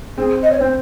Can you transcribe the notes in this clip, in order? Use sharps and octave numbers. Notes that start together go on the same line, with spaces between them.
C4 G#4
D#5
C#5
C4 C5